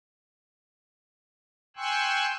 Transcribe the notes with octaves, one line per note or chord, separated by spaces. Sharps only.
G5 G#5 C6 C#6 E6 F#6